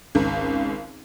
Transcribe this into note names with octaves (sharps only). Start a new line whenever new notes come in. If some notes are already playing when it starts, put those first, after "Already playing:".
G#1 C#2